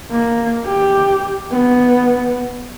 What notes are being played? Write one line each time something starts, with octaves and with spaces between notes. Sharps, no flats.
A#3
G4
B3